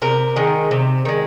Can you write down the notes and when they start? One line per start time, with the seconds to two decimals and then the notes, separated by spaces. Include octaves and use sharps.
0.02 C3 A#4
0.36 D#3 G#3
0.71 C3
1.05 D#3 G#3